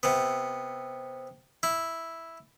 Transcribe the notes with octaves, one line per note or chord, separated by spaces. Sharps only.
C3 B3
E4